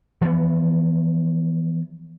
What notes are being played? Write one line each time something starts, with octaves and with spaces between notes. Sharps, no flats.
E3 F3 G#3 B3